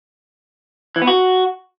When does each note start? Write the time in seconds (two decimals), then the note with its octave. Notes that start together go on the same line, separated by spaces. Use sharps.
0.96 E3
1.02 B3
1.07 F#4